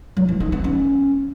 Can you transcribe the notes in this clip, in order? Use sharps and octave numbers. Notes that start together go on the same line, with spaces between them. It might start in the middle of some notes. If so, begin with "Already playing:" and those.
F#3
E3
D#4
B3
C#4